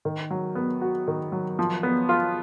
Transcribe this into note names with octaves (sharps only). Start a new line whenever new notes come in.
D#3
F#3
B3
F#4
D#3
F#3
F3
B3
F4